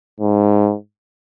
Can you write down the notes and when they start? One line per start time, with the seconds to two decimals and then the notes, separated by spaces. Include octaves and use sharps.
0.20 G#2